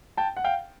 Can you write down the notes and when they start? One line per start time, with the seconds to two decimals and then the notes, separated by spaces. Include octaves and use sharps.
0.17 G5 A5
0.37 F#5
0.44 F5 G5